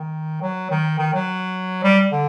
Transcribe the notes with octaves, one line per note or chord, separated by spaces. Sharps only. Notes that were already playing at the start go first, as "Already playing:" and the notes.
Already playing: D#3
F#3
D#3
D#3
F#3
G3
D3